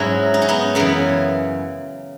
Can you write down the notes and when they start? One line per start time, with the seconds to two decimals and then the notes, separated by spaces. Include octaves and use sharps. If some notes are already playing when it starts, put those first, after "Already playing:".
Already playing: G#2 F#3 C#4 E4 F#4
0.34 D#4
0.42 C#4
0.49 B3 D#4
0.75 F#2 C#3 E3 B3